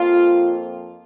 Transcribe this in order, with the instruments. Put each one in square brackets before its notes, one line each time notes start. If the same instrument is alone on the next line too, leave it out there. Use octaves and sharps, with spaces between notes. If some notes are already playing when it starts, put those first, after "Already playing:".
Already playing: [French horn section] F2 F3 A#3 F4